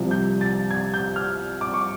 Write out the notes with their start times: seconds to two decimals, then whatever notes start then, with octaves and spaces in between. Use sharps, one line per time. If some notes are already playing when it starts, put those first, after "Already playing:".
Already playing: C2 C3 F3
0.11 G6
0.41 A6
0.71 G#6
0.94 G6
1.16 F6
1.61 D6
1.74 C#6